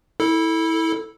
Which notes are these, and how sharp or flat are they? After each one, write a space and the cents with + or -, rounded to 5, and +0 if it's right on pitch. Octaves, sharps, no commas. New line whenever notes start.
E4 -20 A4 +0